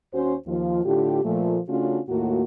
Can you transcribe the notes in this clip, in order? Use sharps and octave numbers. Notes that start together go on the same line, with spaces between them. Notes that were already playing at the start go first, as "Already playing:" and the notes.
D#2 C#4 F#4 C5
D#2 F3 F4
A2 D3 F4 G4
A#2 F3 A3
C#3 A3 C#4 D4 F4 F#4
D#2 A2 A#3 F4 F#4